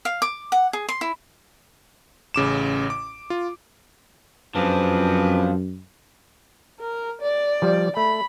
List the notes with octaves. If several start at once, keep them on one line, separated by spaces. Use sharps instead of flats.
F5
D6
F#5
G#4
C6
E4
A1 C#3 D6 E7
D6
F4
F#2 F3 C4 D4 G#4 B4
A#4
D5
F3 G3
A3 B5